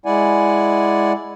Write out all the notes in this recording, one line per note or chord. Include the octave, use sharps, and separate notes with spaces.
G#3 E4 D5 F#5 G#5